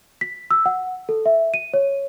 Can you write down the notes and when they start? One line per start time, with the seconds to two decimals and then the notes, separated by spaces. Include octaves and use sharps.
0.21 B6
0.51 E6
0.66 F#5
1.09 A4
1.26 E5
1.54 D#7
1.74 C#5